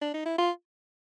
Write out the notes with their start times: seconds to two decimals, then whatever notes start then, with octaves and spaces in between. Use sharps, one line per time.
0.02 D4
0.14 D#4
0.25 E4
0.38 F4